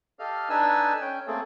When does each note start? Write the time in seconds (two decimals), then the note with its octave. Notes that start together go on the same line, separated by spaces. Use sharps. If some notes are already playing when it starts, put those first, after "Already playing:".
0.19 G4 A4 D#5 F5 F6
0.49 D4 D#4 A4 B4 G#5 E6
1.01 C#4 G5
1.27 A3 A#3 C4 G#4 A4